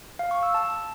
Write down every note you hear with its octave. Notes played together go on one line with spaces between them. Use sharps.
F5
C#6
E6
A5